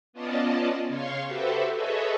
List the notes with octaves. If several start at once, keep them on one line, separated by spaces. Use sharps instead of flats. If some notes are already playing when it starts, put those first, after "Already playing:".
B3 C#4 F4 D5 D#5 A5
C#3 C#5 F5 C6 C#6
F#4 G4 A4 B4 C5 E5
G#4 A4 B4 C#5 D#5 E5